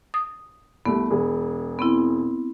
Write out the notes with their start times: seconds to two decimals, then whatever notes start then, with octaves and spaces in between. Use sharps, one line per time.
0.14 D#6
0.86 C2 A3 B3
1.10 E1 G#4
1.79 B3 C4 E4